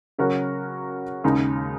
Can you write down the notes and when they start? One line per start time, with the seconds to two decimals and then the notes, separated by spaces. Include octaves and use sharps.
0.18 C#3 F#3 C#4 F#4 A#4
1.24 D#2 C#3 G#3 D#4